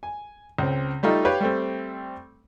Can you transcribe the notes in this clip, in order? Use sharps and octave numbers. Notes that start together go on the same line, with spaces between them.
G#5
C#2 C4
G3 A3 D#4 F4
G4 B4 C#5 F5
G3 A3 C4